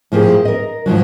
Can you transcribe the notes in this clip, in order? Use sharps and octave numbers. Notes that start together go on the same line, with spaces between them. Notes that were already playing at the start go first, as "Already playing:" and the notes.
A2 F3 A#3 G4 G#4
A#4 D#5
G#2 D#3 F3 F#3